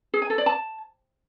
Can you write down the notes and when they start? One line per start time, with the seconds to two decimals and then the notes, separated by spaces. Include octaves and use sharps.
0.14 G#4
0.22 G#5
0.30 A4
0.38 D5
0.46 A5